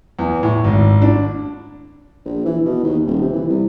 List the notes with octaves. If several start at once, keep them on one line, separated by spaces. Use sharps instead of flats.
E2
A2
G#1
D4
A#1
E3
B2
D#2
D#1
C3
E3
C2